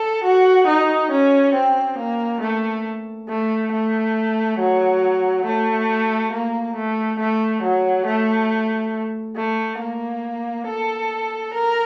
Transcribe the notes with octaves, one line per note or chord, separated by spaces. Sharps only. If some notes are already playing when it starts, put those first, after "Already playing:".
Already playing: A4
F#4
D#4
C#4
C4
A#3
A3
A3
A3
F#3
A3
A#3
A3
A3
F#3
A3
A3
A#3
A4
A#4